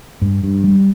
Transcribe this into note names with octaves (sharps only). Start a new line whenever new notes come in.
G2
G2
G3